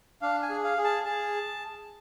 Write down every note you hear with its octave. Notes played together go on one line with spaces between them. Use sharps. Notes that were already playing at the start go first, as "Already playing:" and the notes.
D4 F5
G#5
G#4
F5
G#4
A5
G#4 A5